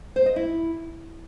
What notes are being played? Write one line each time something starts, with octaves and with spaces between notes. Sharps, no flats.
C5
D#5
E4